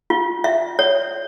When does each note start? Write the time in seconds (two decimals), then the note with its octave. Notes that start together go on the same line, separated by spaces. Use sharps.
0.10 F4
0.44 E5
0.79 C#5